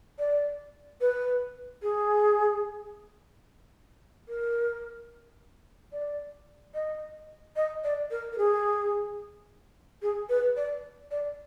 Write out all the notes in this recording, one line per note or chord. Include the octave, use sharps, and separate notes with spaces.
D5
B4
G#4
A#4
D5
D#5
D#5
D5
A#4
A#4
G#4
G#4
B4
D5
D5